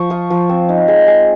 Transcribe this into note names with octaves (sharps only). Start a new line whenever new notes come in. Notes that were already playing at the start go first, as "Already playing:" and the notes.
Already playing: F3 C#6
F4 D#6
F3
C4
D#4
G#3
G#3